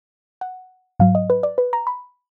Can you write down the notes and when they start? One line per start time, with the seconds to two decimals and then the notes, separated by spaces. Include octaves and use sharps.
0.41 F#5
1.00 G#2 F#3 F5
1.15 D#5
1.30 B4
1.43 D5
1.58 B4
1.73 A#5
1.87 B5